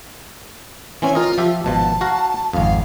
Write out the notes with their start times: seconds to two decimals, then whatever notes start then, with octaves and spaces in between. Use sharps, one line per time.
1.02 E3 C4 C#4 G#5
1.15 F4 A#4 D#5
1.38 F3 G4 E5
1.64 G#1 B2 F3 A5
2.01 F#4 F5 A#5
2.53 G#1 F2 F5